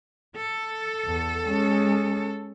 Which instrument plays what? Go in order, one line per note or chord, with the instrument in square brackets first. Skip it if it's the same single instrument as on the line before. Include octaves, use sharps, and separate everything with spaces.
[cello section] A4
[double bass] E2
G#3 C#4